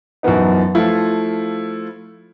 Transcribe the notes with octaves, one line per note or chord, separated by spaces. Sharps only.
F#2 E3 F3 B3 D#4
F3 A3 E4 F4